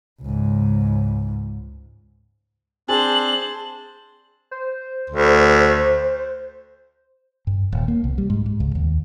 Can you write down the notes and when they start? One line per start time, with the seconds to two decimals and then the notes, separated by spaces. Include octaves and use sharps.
0.22 C#2 G#2
2.88 C4 D4 G#4 C5 A5 F#7
4.51 C5
5.10 D2
7.47 G2
7.72 D#1
7.88 A#3
8.04 C2
8.18 G3
8.30 G#2
8.46 G#2
8.60 C#2
8.75 D#2